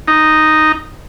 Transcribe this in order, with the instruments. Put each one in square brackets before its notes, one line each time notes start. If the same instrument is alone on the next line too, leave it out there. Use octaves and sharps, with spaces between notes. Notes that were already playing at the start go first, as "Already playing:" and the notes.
[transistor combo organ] D#4